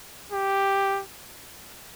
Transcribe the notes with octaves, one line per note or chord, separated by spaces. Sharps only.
G4